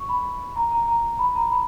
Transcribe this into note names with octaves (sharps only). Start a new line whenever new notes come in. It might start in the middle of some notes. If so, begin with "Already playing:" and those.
Already playing: C#6
B5
A#5
A#5
A#5
B5
A#5
B5